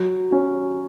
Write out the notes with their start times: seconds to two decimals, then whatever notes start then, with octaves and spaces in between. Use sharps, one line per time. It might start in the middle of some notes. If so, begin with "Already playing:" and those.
Already playing: F#3
0.31 C#4 F#4